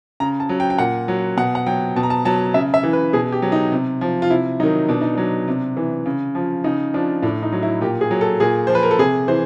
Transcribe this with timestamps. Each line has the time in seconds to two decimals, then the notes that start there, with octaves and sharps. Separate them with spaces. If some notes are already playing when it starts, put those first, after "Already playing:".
0.20 C#3 A#5
0.40 A5
0.49 F#3
0.60 G5
0.70 G5
0.78 A#2 F#5
1.08 F#3
1.37 B2 F#5
1.55 F#5
1.67 F#3 G5
1.96 B2 A5
2.03 A#5
2.10 A5
2.25 F#3 A5
2.54 C#3 E5
2.74 E5
2.83 E3
2.93 B4
3.13 B2 G#4
3.32 G4
3.42 F#3
3.52 D#4
3.72 C3
4.01 F3
4.22 F4
4.30 C3 E4
4.60 D#3 F#3 D#4
4.89 B2 D4
5.01 D#4
5.15 F#3 D4
5.48 C3
5.77 E3
6.06 C#3
6.35 F3
6.64 C#3 D#4
6.94 F3 D4
7.23 A2 D4
7.43 D#4
7.52 F#3
7.63 E4
7.81 A#2 G4
8.01 G#4
8.11 F#3
8.21 A4
8.40 A#2 G#4
8.67 F3 C5
8.75 B4
8.83 A#4
8.91 A4
8.98 C3 G#4
9.28 E3 C5